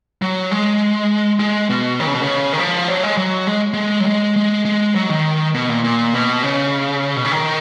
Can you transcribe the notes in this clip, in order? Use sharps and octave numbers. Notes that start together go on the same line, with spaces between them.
F#3
G#3
G#3
B2
D#3
C#3
B2
C#3
D#3
F3
F#3
G#3
F#3
G#3
G#3
F#3
G#3
G#3
G#3
F#3
D#3
B2
A#2
A#2
B2
C#3
B2
C#3
D#3